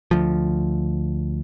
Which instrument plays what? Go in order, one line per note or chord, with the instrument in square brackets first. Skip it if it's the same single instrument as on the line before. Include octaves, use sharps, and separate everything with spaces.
[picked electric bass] D2 F3